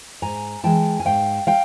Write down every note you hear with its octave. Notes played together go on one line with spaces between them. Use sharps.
G#2 G#5 A#5
E3 G#3 G5 A5
G#5
G#2 F5 G5
G#3 F5 G5